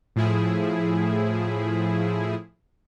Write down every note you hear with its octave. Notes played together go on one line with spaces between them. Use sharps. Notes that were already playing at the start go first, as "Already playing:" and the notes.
A2 F3 E4 G#4